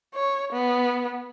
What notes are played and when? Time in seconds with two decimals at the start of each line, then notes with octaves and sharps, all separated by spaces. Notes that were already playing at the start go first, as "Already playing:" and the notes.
0.14 C#5
0.52 B3